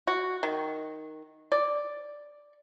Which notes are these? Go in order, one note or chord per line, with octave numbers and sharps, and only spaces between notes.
F#4
D#3
D5